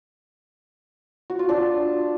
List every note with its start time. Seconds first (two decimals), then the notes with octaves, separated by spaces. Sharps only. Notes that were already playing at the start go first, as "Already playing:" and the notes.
1.30 F#4
1.39 F4
1.49 D4